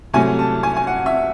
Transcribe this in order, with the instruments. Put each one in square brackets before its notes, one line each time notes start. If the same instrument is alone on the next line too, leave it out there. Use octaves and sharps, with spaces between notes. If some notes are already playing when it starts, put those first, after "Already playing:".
[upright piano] C2 C3 F#3 A3 G#5
A5
G#5
G#5
F#5
E5